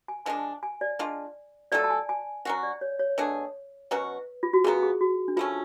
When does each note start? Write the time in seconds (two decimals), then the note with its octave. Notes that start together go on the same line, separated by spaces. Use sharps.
0.08 G#5
0.26 F3 G#3 D4 G#5
0.63 G#5
0.81 D5
0.99 G#3 D4 F4
1.72 F#3 A3 F4 A4 D5
1.84 A5
1.90 G#5
2.09 G#5
2.45 F#3 C#4 F#4 F#5
2.63 D5
2.81 C#5
2.99 C#5
3.18 B2 A3 D4 G#4
3.91 B2 F#3 C#4 F#4 B4
4.43 F4
4.53 F#4
4.64 C#3 F#3 B3 G#4
4.83 G#4
5.01 F#4
5.28 D4
5.37 F3 A3 C#4 F4